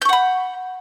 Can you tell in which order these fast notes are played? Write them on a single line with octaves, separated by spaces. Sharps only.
G6 C#6 F#5 B5